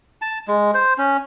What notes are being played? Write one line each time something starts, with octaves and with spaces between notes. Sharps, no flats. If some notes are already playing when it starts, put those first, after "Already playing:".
A5
G#3
C5
C#4